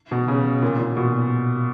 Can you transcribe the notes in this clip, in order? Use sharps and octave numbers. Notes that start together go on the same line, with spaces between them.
B2
C#3
A#2
A#2
B2